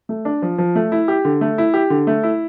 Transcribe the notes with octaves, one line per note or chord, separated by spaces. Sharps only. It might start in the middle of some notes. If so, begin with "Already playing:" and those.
A3
D4
F3
F3
A3
E4
G4
D3
A3
E4
G4
D3
A3
E4